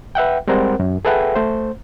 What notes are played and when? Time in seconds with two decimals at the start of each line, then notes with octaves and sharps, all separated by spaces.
0.15 B4 E5 F#5 G5
0.48 G3 G#3 C4 A#4 C5 F#5
0.80 F#2
1.05 G#4 A4 B4 E5 F#5 G5
1.36 A3 C5